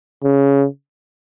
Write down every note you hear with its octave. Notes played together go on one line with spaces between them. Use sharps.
C#3